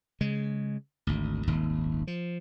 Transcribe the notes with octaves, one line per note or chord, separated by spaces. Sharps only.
C#3 G#3
G#1 D2
D#1 G#1 D#2
F3